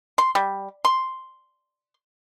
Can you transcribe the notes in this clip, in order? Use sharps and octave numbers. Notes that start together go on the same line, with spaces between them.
C6
G3
C6